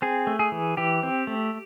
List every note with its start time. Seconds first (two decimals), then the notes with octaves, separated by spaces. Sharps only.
0.02 C4 G#4
0.27 A3
0.39 G#4
0.52 E3
0.77 E3 G4
1.03 C4
1.27 A3